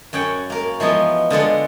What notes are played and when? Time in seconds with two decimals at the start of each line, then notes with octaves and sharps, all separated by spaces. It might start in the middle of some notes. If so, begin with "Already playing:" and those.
0.13 F#2 C#4 F#5 G5
0.50 A#3 A#4
0.80 E3 F3 G#3 B3 F4
1.30 D3 G#3 F4 F#5